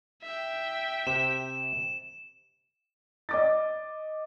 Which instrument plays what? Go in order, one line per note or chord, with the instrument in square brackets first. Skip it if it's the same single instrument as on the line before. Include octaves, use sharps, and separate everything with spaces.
[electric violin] E5 G5
[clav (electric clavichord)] C3 [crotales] E7
[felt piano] D#5 D6 A6